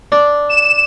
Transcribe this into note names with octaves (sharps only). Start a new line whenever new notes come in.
D4
E7